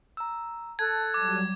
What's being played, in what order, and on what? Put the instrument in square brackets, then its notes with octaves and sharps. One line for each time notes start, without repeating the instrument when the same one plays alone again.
[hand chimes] A#5 E6
[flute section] A4 F#6 [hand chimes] A5 [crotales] G#6
[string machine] F#3 G3 [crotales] D6